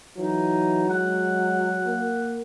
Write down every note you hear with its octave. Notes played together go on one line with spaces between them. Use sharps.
E3 F#3 D#4
G#3 F#5
A#3